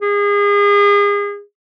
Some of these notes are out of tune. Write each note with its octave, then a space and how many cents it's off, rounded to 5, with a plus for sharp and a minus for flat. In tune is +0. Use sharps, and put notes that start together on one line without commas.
G#4 -35